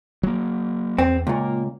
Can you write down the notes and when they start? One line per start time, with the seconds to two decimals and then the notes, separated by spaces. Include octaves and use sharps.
0.23 F#3 A#3
0.98 E2 C4
1.27 C#2 A#2 A#3